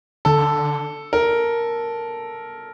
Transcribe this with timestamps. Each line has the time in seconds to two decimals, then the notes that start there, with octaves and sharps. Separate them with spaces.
0.25 D3 A4
1.13 A#4